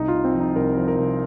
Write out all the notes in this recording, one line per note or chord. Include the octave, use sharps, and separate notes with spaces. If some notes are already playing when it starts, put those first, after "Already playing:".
Already playing: C2 D#4
F4
C2
C4
F3
D#4
C2 A#4
F3
A#4
C2